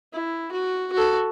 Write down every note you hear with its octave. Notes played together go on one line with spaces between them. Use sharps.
E4
F#4
F#4 A4